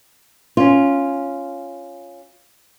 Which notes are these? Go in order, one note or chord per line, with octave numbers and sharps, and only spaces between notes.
C#4 F4